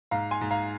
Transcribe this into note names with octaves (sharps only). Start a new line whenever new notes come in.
G#2 F5 A#5
G#5 C6
G#2
F5 A#5